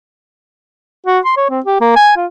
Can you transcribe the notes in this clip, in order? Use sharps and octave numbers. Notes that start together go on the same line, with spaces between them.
F#4
C6
C#5
C4
G4
A#3
G#5
F4